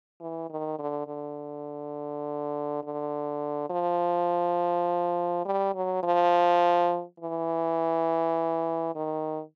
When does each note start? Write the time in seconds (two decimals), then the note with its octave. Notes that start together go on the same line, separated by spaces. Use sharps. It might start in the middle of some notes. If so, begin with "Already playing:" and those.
0.20 E3
0.49 D#3
0.79 D3
1.07 D3
2.83 D3
3.70 F3
5.45 G3
5.75 F#3
6.03 F3
7.20 E3
8.95 D#3